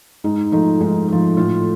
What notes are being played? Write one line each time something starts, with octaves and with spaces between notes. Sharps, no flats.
G#2 D#4
F3 A3 D#4
G#2 D#4
F3 A3
A2 F4